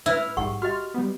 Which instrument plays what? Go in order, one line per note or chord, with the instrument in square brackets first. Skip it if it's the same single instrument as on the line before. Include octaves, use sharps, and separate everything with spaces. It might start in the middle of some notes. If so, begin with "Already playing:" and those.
[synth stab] A2 B4 F6 [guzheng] E4 [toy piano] E5
[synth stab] A#1 G#2 G3 [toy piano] G#4 F#5 C#6
[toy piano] F#4 G4 D#5 [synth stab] F6
[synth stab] G3 B3